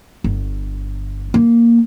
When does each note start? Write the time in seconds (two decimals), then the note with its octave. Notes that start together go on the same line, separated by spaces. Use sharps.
0.24 G1
1.34 A#3